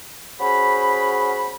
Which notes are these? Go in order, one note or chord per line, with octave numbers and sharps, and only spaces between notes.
C#4 F#4 G#4 C5 B5